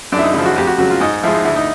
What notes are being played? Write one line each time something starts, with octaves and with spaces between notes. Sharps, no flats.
F#2 D4
E4
D#4
C#3 F3 E4
F#4
F2 G4
F#4
C#3 F#3 F#4
F4
G#2 D#4
F3 G#3 E4
D#4
D2 E4
D#4